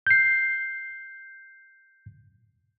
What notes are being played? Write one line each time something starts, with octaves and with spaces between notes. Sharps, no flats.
G6 C7